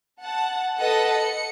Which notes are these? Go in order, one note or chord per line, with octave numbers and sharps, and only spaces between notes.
F#5 A5
A4 B4 D#5 F#5 A5
C#7